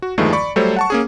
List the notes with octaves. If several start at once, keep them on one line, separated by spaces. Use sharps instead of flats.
F#4
E2 G2 D#3 F3 G#3 A3
D5 B5 C#6
F#3 G3 A3 A4 C5 C#5
F#5 A5 C#6
A#3 C#4 G#4